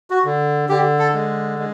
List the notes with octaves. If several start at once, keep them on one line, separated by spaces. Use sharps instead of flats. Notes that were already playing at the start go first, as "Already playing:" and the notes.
F#4
D3
D3 G4
A4
G#3
G#3